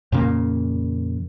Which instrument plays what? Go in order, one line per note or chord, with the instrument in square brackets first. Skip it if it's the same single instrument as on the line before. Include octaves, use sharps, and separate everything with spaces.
[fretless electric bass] F2 A#2 C#3 A#3